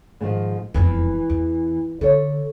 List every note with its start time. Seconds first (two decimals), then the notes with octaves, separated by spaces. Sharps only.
0.21 G#2 D#3 F3
0.74 E1 F2 E3
1.30 E2
2.01 D3 A4 C#5